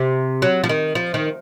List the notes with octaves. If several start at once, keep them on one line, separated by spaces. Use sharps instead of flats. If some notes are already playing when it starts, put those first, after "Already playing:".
Already playing: C3
F#3
F3
D#3
F3
D#3